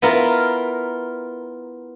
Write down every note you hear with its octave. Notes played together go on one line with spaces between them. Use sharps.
B3 E4 F4 A#4